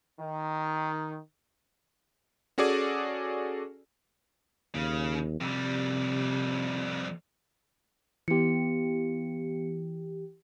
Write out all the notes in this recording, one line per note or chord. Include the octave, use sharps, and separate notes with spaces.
D#3
C#4 F#4 G#4 A4 D5 G#5
D#2 C#3
F2 C3 G3
E3 B3 G4 C#7